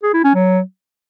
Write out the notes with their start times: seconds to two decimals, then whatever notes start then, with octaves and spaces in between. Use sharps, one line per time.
0.03 G#4
0.14 E4
0.24 C#4
0.35 F#3